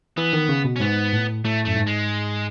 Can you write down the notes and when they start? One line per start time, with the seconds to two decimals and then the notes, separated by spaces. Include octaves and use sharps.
0.17 E3 B3
0.33 D#3
0.49 C#3
0.64 B2
0.76 C#4
0.80 G#2 B3
1.13 A2
1.45 A2 A3
1.65 F#2 A3
1.76 G#2
1.87 G#3